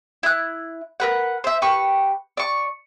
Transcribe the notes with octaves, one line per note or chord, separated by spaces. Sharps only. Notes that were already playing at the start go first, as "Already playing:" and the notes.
E4 F#6
A#4 B4 F#5
C5 E5
G4 B4 C#6
D5 C#6